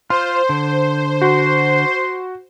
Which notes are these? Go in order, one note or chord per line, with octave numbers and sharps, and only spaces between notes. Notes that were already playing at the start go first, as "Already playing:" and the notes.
F4 C5 C6
D3
F#4 C6